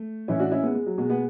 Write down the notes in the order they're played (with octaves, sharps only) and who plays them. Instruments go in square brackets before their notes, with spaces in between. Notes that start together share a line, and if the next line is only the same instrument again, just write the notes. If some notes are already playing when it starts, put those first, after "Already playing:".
Already playing: [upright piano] A3
A2 E3 C#4 E4
D4 F#4
C#4 E4
G#3 B3
G#3
F#3
B2 G#3
G#3 B3